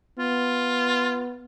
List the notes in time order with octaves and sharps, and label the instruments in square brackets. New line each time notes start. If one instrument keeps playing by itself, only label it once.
[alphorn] B3 [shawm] F4